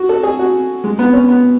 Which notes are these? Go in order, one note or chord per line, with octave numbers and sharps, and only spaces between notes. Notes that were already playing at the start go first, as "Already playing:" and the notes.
Already playing: F#4
A4
G#4
F#4
G#3
B3
C#4
B3